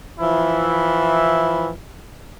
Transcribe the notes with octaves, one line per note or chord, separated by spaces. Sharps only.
E3 F3 E4